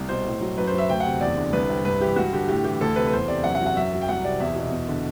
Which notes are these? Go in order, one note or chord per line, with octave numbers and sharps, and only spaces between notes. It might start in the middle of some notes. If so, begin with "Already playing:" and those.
Already playing: C2
B2 C5
A2
F#3
F#2 B4
C5
F#3
E5
D2 G5
C3 F#5
E2 D5
D3
C2 B4
C3
G2 B4
E3 G4
G2 F#4
D3 G4
A2 G4
E3 G4
D2 A4
C3 B4
B4
E2 C5
C3 D5
F#2 F#5
F#5
F#3
F#5
F#2 E5
F#3
G5
C2 F#5
C3 D5
E2 E5
B2
E2
D3